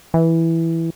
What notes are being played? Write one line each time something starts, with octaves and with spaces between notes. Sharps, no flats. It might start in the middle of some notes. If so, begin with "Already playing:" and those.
E3